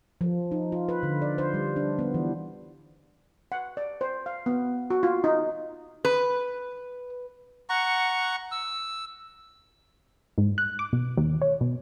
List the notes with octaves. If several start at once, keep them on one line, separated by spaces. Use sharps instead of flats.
F3
D#4
F4
B4
D3
D5
C5
G3
D4
B3
E3
F#5
D5
C5
F5
B3
F#4
F4
D#4
B4
F#5 A#5 C#6
E6
G#2
F#6
D6
B2
D#2
C#5
B2